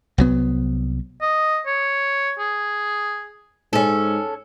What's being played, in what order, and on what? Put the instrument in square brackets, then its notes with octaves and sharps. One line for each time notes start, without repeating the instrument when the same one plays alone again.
[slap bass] C2 F#3 B3
[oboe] D#5
C#5
G#4
[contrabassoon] G#2 [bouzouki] C#4 A4